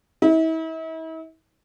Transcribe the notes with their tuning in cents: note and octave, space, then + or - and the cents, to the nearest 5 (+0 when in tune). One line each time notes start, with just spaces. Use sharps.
E4 -40